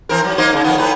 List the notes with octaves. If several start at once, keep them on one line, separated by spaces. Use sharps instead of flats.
E3 C4 A#4
F#3
A#3 D#4 C5
C#3
F2 D#3 B3
A2 B4